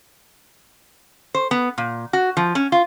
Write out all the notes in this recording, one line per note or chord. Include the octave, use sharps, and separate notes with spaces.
C5
B3
A#2
F#4
F3
C#4
F4